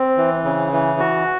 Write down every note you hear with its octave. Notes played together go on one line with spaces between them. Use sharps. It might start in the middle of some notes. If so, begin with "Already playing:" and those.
Already playing: C4
E3
C#3
E3
F#4